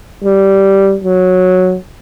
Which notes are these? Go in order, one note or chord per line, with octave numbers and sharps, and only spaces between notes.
G3
F#3